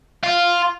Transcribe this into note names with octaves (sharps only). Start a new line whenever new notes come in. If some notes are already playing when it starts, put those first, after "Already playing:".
F4